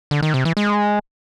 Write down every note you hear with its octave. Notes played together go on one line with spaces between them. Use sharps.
D3
D#3
C3
E3
G#3